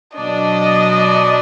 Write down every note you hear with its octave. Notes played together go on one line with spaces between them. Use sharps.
B2 F#3 D4 D#5